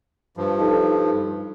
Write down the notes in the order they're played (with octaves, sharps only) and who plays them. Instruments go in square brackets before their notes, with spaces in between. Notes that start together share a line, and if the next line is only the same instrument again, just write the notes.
[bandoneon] G2 F3
[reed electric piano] D#4 A4